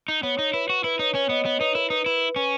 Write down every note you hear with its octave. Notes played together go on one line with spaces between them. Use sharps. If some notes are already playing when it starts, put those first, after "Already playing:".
D#4
B3 C#5
D#4
E4 B4
F#4
E4 B4
D#4 C#5
C#4 C#5
B3 D#5
B3 C#5
D#4 B4
E4 A#4
D#4 B4
E4 B4
C#4 B4